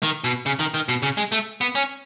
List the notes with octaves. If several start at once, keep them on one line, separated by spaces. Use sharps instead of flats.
D#3
B2
C#3
D#3
D#3
B2
C#3
G#3
A3
B3
C#4